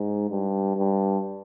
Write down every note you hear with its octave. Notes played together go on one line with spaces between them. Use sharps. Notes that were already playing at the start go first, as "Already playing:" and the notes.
Already playing: G#2
G2
G2